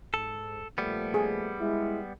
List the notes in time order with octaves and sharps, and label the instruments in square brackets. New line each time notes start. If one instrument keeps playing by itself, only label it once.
[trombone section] G#2 [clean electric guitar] A4
[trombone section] A#2 F3 A3 [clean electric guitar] G3 B3
[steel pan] G#4
[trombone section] G#3 E4